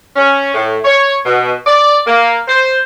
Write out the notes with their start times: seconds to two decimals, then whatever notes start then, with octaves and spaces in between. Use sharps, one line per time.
0.16 C#4
0.54 A2
0.84 C#5
1.25 B2
1.67 D5
2.07 A#3
2.48 C5